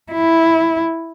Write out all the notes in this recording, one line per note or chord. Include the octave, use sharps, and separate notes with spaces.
E4